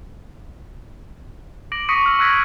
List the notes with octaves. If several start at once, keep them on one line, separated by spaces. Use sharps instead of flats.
D6 A#6 D7 F#7
C#6 D#6 A#6 B6 C#7 D#7
E6 F6
C#6 E6 F#6 G#6 A#6 B6